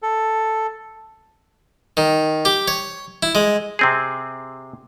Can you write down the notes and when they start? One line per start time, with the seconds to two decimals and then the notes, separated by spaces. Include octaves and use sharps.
0.02 A4
1.97 D#3
2.45 G4
2.68 C#5
3.23 E4
3.35 G#3
3.79 C3 C4 G#4